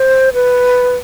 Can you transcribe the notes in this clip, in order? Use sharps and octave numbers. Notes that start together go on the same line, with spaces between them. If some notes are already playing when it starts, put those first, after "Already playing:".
Already playing: C5
B4